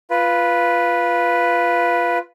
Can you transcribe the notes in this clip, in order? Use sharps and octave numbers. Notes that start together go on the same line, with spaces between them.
F4 B4